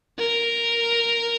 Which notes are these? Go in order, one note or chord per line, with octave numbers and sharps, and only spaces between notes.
A#4